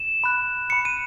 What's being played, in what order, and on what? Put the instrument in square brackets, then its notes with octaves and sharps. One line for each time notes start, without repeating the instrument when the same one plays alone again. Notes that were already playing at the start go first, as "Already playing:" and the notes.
Already playing: [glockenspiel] E7
B5 F#6
B5 F#6 C#7
D#7